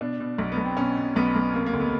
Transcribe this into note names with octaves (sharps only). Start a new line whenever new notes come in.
B2 D4
B2
B1
B3
B1
C4
B2 C#4
B2
B1 B3
B1
C3 A#3
A#3
D2
B3